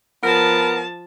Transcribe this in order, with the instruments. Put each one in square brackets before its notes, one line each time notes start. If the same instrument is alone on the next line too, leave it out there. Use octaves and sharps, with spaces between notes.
[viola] F3 A5 [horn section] B3 A#4